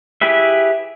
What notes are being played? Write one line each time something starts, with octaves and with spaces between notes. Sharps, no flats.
E4 G4 G#4 B4 E5